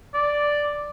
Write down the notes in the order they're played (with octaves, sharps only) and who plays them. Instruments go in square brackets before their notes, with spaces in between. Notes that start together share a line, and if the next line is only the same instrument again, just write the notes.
[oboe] D5